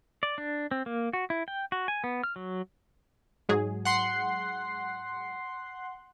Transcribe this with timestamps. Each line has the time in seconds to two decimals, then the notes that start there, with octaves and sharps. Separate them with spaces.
0.23 D5
0.38 D4
0.71 C4
0.86 A#3
1.13 F#4
1.30 E4
1.48 G5
1.72 F#4
1.88 G#5
2.04 B3
2.24 F6
2.36 F#3
3.49 G#2 F#3 G#4
3.85 F#5 C6 C7